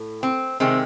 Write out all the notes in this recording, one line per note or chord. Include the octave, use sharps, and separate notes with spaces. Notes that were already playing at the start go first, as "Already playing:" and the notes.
Already playing: A2
C4
C3 D#3 G#3 C4